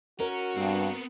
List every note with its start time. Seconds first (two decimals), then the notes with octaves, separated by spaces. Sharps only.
0.20 C#4 F#4 A#4
0.57 G2 B3 C4